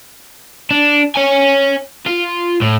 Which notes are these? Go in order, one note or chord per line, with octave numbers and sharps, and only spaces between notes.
D4
C#5 G#5
F4
A2